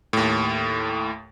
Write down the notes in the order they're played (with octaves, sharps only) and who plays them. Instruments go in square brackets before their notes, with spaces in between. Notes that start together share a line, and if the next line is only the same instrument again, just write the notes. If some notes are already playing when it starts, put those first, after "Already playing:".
[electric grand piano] D#2 A2